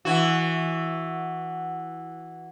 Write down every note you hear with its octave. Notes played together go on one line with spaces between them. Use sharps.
E3 F#4